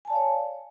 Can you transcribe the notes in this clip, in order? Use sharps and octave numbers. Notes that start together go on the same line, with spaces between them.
C#5 D5 F5 G#5 A5